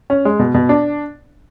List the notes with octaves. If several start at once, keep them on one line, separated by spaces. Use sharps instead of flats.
C#4
G#3
B2
B2
D4